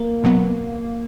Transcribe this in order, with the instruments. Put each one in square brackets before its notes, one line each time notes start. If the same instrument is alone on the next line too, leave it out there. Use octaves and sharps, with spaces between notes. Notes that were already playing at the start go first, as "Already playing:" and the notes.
Already playing: [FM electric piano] A#3
[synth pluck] C#2 B2 F#3 B3